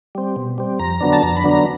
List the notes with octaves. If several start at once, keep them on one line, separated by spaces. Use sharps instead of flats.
G3 C4
B2
G3 C4
F2 A#5
D3 F#3 B3 D4
A5
F2 A#5
B5
D3 F#3 B3 D4
A#5